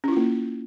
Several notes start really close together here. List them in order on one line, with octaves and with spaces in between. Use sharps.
C#4 E4 F4 A#3